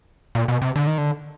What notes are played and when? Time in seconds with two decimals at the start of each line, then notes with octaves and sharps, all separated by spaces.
0.35 A#2
0.48 B2
0.62 C3
0.76 D3
0.87 D#3
0.98 D3